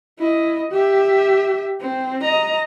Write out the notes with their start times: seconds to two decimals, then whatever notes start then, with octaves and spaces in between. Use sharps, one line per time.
0.19 E4 D#5
0.72 G4 E5
1.80 C4
2.23 D#5 A#5